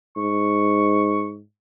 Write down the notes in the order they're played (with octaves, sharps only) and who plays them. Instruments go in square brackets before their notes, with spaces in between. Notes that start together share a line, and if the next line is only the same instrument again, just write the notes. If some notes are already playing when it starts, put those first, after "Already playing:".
[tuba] G#2 [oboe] C#6